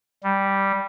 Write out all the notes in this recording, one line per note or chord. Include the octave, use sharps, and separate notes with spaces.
G3